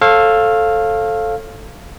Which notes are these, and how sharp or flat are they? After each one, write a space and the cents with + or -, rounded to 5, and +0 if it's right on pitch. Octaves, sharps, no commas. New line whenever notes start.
A4 +0 C#5 -40 F5 +0